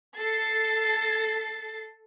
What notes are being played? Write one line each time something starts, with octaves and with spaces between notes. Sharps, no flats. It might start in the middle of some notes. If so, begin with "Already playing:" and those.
A4 A6 C7